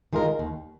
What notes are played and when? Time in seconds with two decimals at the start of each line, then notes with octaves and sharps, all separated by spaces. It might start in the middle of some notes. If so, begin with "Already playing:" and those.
0.13 D#3 G#3 F4 A#4
0.39 D#2